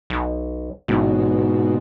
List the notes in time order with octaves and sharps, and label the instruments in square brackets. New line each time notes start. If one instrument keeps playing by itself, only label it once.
[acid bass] B1
[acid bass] A1 [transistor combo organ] G#2 B2